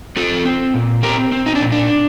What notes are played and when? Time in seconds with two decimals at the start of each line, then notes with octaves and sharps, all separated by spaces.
0.16 C4 F4 A4
0.45 C4
0.74 A#2
1.03 C4 G4 A#4
1.32 C4
1.46 D#4
1.55 D4
1.60 A#2
1.72 D4